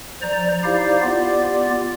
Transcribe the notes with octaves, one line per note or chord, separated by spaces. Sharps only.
F3 C5 D5 A#5
D#4 E4 G4 C5 D5 F5
B3 F4 G4 D5